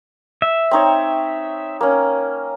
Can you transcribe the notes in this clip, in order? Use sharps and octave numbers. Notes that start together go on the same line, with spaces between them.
E5
C4 D#4 C#5
A#3 C#4